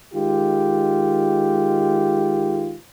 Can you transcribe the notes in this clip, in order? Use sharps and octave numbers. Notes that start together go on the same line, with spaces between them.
D#3 G#3 F4 G4